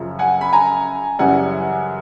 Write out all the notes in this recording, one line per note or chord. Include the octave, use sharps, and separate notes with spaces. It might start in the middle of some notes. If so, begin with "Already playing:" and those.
Already playing: F#2 C#3 F3
F#5 G#5
B5
G#5 A#5
F#2 C#3 E3 G3 F#5 G#5